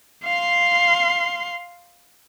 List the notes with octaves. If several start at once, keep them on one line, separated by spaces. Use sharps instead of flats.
F5 C6